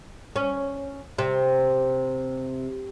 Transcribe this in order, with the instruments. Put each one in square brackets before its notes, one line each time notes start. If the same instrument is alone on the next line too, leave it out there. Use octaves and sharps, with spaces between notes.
[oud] C#4
C3